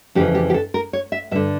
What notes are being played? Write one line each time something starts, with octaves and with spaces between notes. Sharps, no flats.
F2 C#3 E3 G4
G4
G4
A4
A#4
C#5
E5
G2 D3 E5